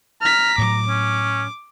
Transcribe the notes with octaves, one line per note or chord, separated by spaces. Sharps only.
A#5 F6 B6
A2 F#3 D6
C#4